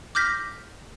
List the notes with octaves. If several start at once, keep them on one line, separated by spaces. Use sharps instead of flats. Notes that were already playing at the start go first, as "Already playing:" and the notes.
D6 F6 G6 A#6 B6